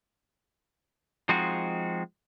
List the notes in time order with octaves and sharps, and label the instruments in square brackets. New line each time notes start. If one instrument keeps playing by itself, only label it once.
[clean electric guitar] F3 G#3 C4 D#4 F#4